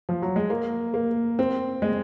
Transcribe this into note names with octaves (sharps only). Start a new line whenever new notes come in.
F3
F#3
G#3
A#3
A#3
C4
G#3